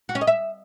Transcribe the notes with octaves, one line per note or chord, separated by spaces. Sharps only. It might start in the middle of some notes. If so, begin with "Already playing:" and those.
F#4
C#4
D#5
E5